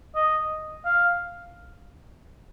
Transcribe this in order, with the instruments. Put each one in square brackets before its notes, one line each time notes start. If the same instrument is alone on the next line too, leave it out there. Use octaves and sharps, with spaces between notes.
[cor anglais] D#5
F5